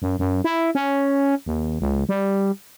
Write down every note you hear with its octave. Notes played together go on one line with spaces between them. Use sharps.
F#2
F#2
E4
C#4
D#2
C#2
G3